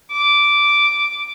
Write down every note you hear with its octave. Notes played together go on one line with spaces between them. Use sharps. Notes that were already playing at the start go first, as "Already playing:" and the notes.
D6